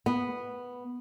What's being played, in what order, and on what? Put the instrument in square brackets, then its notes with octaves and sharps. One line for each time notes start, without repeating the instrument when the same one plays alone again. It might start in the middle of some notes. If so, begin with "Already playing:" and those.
[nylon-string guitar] B3